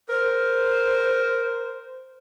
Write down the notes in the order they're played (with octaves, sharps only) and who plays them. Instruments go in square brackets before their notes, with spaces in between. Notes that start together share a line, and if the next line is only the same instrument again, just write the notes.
[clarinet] A#4 [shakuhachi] C5